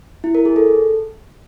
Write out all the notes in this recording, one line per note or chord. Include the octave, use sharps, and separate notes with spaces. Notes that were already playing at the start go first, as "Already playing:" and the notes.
E4
A#4
G#4
A4